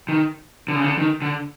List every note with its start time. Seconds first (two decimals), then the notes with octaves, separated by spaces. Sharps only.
0.09 D#3
0.68 D3
0.76 C#3
0.84 D3
0.98 D#3
1.22 D3